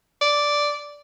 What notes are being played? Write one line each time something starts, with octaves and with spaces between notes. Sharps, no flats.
D5